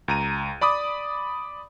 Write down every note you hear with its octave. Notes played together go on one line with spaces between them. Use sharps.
C#2 A#5 D#7
D5 B5 D6 D#6